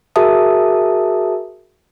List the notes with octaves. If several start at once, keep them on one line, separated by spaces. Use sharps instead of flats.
F#4 G#4 A#4 E5 A5 D#6